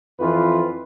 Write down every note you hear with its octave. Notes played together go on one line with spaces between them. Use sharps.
F2 E3 F4 B4